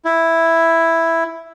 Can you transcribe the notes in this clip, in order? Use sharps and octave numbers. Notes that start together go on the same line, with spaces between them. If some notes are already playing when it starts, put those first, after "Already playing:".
E4